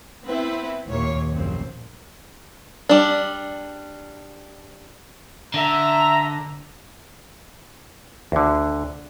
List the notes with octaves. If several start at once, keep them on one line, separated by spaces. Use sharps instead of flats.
B3 C4 E4 B4
D#2 A#2 C#5
A#1 F#2 A#2 C4
G3 D4
D3 E5 A#5
D2 D3